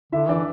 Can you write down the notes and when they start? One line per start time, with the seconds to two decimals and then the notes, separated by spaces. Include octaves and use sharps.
0.12 D3 E4 E5
0.29 E3 D4 D5